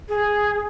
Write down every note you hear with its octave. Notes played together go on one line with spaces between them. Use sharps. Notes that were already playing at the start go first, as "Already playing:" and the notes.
G#4